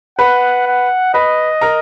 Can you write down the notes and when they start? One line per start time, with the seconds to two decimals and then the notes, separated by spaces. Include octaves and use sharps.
0.19 B4 F#5 B5
0.67 F#5
1.14 B4 D#5 B5
1.61 A#4 A#5